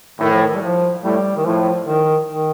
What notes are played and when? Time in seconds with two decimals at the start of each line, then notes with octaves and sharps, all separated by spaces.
0.19 A2 D#3
0.33 F3
0.45 D#3
0.55 G3
0.62 F3
1.03 A2 G3
1.37 D#3
1.45 A2 F3
1.87 D#3
2.29 D#3